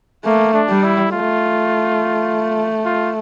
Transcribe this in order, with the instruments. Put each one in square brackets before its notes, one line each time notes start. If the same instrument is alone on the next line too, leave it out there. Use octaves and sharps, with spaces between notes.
[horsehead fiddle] A3 [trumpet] A#3
[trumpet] D4
[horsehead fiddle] G3
[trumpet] E4
[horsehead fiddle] A3 [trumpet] F4
[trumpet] F4